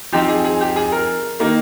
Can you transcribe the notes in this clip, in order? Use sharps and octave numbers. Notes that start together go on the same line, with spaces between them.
F3 C4 D#4 G4
G#4
G#4
G4
G#4
A#4
D#3 A#3 D#4